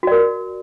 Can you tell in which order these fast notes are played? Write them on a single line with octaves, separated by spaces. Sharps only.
F#4 D5 A#4